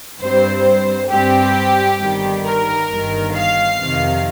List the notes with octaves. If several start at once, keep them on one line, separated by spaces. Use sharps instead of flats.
G2 G3 C4 C5
G2 G3 C4 G4
G1 G2 D#3 G3
A#4
G1 G2 D#3
F5
F2 C3 D#3